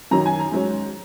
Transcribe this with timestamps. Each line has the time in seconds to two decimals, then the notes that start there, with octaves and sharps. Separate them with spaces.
0.11 F#2 D#3 F#3 C#4 A#5
0.26 G#5
0.40 A#5
0.52 G#2 F#3 C#4